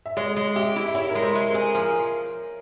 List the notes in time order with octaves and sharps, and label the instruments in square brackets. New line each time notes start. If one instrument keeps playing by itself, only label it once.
[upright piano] E5
[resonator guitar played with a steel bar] G#3 [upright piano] C#5
[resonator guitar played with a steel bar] G#3
[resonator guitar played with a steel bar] G4 [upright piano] E5
[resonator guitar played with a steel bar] E4
[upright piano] E5
[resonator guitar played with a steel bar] E4 [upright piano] C#5
[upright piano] A#4
[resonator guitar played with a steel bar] G#3
[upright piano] C5
[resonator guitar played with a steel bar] G#3
[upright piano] A#4
[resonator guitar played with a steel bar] G#4
[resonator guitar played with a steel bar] F3 [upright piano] A#4